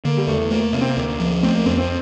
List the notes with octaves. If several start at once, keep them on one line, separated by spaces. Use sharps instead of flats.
D3 A#3
G3
E2 A3
A3 A#3
C3 A#3
C4
A#3
D2
F3
A3 C4
A#3
F2 C4
C4